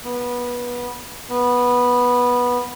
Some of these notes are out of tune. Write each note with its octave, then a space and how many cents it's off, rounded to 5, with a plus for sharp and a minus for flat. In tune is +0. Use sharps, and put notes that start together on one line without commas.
B3 -20
B3 -10